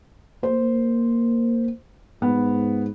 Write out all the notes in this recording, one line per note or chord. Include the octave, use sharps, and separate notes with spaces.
A#3 C5
G#2 B3